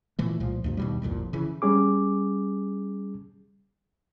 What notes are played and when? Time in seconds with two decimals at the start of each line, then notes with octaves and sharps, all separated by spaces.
0.19 A#2 E3 A3
0.40 C2 A#2 F3
0.64 D2 G2 C3
0.77 D#2 B2 G3
1.02 G1 C2 F2 A#2
1.33 C#3 E3
1.62 G3 C#4 G#4 D6